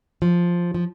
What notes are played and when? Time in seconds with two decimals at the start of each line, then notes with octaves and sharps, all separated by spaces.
0.22 F3
0.74 F3